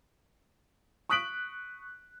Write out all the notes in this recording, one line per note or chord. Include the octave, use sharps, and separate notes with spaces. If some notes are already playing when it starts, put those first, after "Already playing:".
C#6 D#6 F#6 B6 D7 F#7